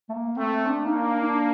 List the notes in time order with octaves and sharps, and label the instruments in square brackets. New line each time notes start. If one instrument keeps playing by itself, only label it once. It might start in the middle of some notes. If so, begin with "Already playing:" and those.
[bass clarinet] A3
A#3
[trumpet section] A3 [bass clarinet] C4
[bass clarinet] D4
[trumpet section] A#3 [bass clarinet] D#4
[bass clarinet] D4
D#4
D4